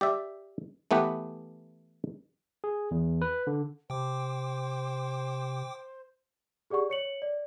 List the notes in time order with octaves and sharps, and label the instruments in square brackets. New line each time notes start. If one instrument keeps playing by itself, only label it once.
[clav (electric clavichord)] G4 D5 E5
E3 A3 B3 G4 B4
[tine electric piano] G#4
E2
B4
D3
[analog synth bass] C3 [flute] C5 [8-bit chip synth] G5 D6
[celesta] G4 G#4 D5 F#5 C#6
C#5 C#7 F#7
D5